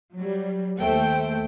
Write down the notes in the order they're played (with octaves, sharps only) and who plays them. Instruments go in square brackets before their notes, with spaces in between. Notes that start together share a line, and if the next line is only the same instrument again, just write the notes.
[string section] F#3 G3
D#2 A3 C5 G5